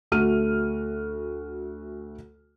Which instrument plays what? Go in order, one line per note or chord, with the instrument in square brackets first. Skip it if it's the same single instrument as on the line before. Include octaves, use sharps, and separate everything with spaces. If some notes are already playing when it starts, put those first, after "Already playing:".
[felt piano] D2 A3 F#4 F6 D#7